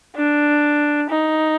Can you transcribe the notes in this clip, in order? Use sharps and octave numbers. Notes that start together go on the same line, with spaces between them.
D4
D#4